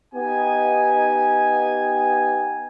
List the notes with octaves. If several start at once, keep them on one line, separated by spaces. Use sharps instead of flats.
B3 D#4 G4 G#5